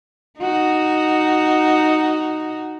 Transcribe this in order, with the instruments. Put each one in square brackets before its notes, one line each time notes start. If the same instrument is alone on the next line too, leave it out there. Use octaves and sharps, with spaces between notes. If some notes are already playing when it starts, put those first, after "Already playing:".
[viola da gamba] D#4 F#4